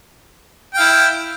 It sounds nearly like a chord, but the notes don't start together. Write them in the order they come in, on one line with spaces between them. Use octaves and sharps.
G5 F5 E4